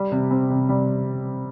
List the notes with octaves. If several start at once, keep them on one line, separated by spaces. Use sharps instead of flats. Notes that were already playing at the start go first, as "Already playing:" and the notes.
Already playing: G3
C3
C4
C3
G3